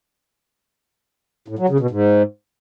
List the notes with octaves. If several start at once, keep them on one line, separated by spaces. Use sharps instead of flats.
A2
F#3
C#3
B2
G#2